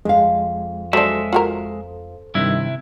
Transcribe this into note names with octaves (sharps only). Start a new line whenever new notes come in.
F2 G#3 F5
F#3 G#3 D4 A4 C5 E5
F4 F#4 A#4
G2 C3 D#3 E4